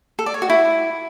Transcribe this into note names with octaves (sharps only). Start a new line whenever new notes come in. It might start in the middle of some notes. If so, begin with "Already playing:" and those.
A4
D5
C#5
F#4
E4